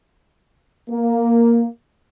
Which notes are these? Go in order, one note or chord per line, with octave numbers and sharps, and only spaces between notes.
A#3